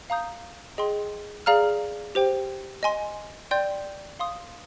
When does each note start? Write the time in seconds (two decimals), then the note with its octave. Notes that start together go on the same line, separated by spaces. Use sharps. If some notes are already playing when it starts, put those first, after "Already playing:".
0.10 F5 A#5 D#6 G6
0.78 G#4 D#5 G5 C6
1.46 G#4 D5 F5 A#5 F6
2.15 G4 C5 G5
2.83 D#5 G#5 C6
3.51 D5 G5 C6 G6
4.19 F5 C6 D#6